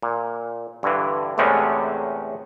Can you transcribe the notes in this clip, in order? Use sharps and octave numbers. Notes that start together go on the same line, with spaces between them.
A#2
G2 D3 E3
E2 A2 C3 G#3 A3 C#4